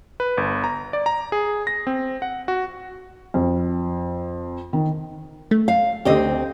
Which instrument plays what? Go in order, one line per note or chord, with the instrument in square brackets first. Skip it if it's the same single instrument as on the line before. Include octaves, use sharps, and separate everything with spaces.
[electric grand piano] B4
G1
A#5
D5
A#5
G#4
A#6
C4
F#5
F#4
[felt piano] F2
D#3
[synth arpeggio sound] A3
[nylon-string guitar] F5
[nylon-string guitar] D2 C4 D#5 [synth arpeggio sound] D3 G4